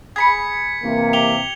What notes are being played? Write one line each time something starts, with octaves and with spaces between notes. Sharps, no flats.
G#4 B5 G#6 B6 C#7
C3 E3 A#3
G4 F7 G7